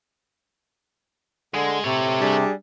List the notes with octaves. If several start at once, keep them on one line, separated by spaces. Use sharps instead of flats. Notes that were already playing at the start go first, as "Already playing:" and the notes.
D3 G#3
C3 A4 C#5
G3 D4 G#4